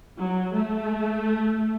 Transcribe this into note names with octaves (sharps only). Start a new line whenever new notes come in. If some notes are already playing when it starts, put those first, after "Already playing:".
F#3
A3